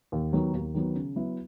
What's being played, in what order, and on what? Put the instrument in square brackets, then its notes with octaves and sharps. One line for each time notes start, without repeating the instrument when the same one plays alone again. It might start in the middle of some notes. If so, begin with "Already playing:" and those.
[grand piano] D#2
D#3 F#3 B3
D#2
D#3 F#3 B3
C#3
F#3 B3 E4